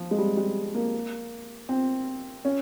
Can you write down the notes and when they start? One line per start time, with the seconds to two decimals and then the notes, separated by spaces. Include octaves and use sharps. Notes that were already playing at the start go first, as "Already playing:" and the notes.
Already playing: F3
0.11 G#3
0.18 G3
0.37 G3
0.74 A#3
1.69 C4
2.45 C#4